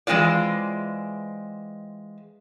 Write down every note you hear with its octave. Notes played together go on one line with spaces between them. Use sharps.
E3 G#3 C4 F4 D5